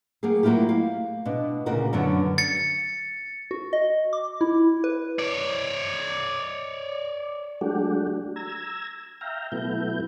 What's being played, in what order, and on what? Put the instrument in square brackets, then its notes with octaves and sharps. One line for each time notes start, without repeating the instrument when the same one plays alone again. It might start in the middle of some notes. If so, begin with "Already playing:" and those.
[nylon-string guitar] F#3 A#3 G4 G#4
F#3 A#3 D4 E4 F4 G4
F5
B2 D4
D2 A#2 C#3 F#4 A#4 D5
F#2 D3 F#3 B3 C#4
[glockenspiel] A6 C#7
[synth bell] F#4
D#5
D6
E4
B4
[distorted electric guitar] C#5 D5
[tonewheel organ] F#3 G#3 A3 D4 F#4 G4
A#5 E6 G#6
E5 F5 G5 A#5
B2 F#3 A3 B3 E4 G6